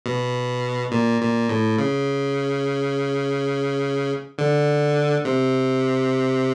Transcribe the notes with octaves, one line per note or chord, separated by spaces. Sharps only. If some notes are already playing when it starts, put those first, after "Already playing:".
B2
A#2
A#2
A2
C#3
D3
C3